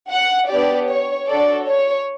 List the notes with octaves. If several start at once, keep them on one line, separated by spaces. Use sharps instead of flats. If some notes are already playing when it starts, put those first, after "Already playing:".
F#5
B3 D4 G4 D5
C#5
D4 F#4 A4 D5
C#5